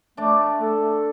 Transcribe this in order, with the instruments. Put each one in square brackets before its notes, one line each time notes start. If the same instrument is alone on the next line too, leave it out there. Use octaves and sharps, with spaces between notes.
[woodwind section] A3 [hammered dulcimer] D4 D5
[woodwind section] A4